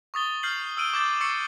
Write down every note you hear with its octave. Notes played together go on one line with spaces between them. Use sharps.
C#6 D#6 A6 G7
F6 G6 C7 F#7
E6 F6 D7 D#7 G7
D6 G6 A6
C#6 E6 A6 C7 C#7